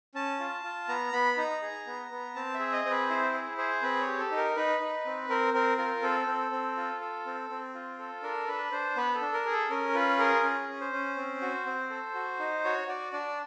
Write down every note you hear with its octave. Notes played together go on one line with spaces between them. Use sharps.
C#4 A5
F4
F4
B3 A#5
B3 B5
D#4 A#5
G#4
B3
B3
C4 A5
E5
G#4
D#5
C4
B4
E4 C5
G#4
G#4 C5
C4 B4
C#5
G4
A4
D#4
A#4
D#4 B4
D#4
C4
C4 A#4
C4 A#4
F4 A#4
C4 A4
C4
C4
F4
A4
C4
C4
F4
A4
D4 A#4
D4 B4
D4 C5
B3 B4
A4
D4
A#4
G#4
A4
C#4 A#4
F4 B4
G#4 A#4
C#4
C#4
C5
C#4
C4
F#4
C4
A4
F#4
D#4
F#4 C#5
F#4 D5
D4 D5